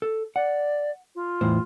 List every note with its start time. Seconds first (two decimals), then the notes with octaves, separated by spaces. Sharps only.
0.02 A4
0.36 D5 F#5
1.15 F4
1.41 E2 A2 C5